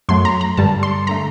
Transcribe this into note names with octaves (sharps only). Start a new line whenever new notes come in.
F#2 F#3 A3 C6
A#5
A#5
G2 D3 G3 A5
C6
D3 A3 A#5